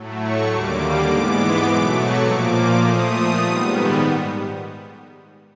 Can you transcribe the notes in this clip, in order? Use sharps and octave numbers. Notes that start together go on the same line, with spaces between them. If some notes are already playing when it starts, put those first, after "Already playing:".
Already playing: A2 F#3 A3
C#6
D#2 D3 G3 A#3 D6
D6
G#2 E3 G#3 B3 D6
B2 F#3 A3
C#6
A#2 F3 A#3 D6
A#2 F3 A3 D#6
G#2 D#3 G3 B3